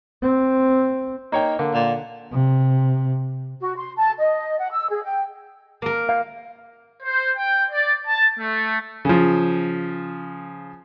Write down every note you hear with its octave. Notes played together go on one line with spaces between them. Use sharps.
C4
A#3 D#4 C#5 G5
D3 A#3
A#2
C3
F#4
C6
A5
D#5
F#5
E6
G#4
G5
A#3 A#4
F5
C5
G5
D5
A5
A3
C#3 F3